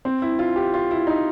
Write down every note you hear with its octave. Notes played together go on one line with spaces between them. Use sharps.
C4
E4
F4
G4
F4
E4
D#4